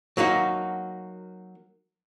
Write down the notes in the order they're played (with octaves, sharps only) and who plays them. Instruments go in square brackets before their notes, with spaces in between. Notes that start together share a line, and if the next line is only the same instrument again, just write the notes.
[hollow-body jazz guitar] F#3 A#3 D#4 F#4